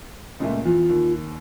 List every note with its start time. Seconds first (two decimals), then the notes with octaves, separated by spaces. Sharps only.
0.40 C#2 A#2 A3
0.65 E2 F4
0.89 D#2